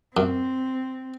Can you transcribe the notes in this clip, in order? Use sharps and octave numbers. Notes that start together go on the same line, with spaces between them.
F#2 C4